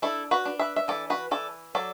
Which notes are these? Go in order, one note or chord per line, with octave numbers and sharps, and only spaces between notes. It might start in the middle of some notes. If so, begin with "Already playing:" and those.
D4 E4 A4
F#4 B4
D4
B4 E5
E5
E3 A4 D5
F#4 B4
E3 A4 D5
F#3 A4 D5